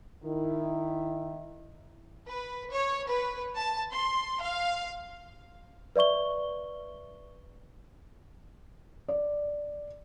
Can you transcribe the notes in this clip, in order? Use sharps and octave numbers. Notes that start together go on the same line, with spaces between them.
D#3 E4
B4
C#5
B4
A5
C6
F5
B4 D5 E5 C#6 G7
D5